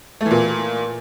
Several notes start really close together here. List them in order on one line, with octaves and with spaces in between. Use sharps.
A3 E3 A#2